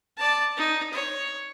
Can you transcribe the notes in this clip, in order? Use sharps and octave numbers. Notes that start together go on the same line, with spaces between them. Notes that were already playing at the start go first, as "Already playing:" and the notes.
D5 A5
D#4
C#5